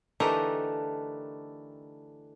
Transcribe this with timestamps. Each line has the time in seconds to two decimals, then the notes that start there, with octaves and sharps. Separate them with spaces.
0.20 D3 E3 A3 D#4 G4 A#4